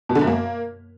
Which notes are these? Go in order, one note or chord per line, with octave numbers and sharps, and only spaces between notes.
B2
D3
F#2
A#3